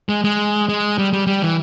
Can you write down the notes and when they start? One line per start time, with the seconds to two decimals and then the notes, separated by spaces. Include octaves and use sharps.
0.09 G#3
0.24 G#3
0.69 G#3
0.98 G3
1.13 G3
1.27 G3
1.42 E3